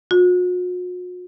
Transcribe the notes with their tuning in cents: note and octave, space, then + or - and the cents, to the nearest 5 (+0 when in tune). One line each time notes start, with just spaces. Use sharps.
F#4 -45